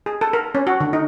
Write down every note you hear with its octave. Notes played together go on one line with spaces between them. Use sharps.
G#4
A4
A#4
C#4
F#4
D3
D#4